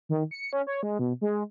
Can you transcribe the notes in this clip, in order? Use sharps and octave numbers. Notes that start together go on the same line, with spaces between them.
D#3
C#7
C#4
C#5
G#3
B2
G#3